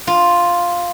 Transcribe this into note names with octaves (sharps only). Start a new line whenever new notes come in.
F4